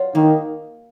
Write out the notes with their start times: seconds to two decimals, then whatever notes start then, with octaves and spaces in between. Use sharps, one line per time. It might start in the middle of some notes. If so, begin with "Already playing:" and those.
Already playing: F#3 F4
0.14 D#3 A#3